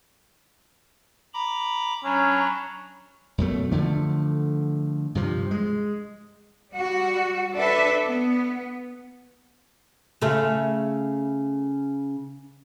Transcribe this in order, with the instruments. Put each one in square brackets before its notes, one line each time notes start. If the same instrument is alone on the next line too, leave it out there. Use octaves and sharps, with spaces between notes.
[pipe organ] A#5 B5 D6
[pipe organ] F#3 D4 [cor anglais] C#4 [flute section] A#5 B5 C#6
[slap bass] F#2 B2 A3
D3 F3 A3
G2 C3 F3
G#3
[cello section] G3 F#4
D4 A4 B4 E5
B3
[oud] C#3 A3